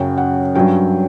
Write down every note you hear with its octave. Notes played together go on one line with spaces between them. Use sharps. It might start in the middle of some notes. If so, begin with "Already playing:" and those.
Already playing: F#2 C#3 F#3 G5
F#5
G2 F#3 C#4 G5